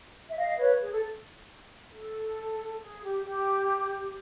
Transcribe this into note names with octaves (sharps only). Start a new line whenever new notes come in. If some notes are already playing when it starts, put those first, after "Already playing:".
E5
D#5 F5
B4 C#5
G#4
A4
A4
G#4
G4
G4